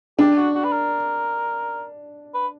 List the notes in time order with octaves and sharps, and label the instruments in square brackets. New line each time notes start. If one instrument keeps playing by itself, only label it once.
[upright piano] D4 [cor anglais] G4
[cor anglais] F#4
F#4
B4
A#4
B4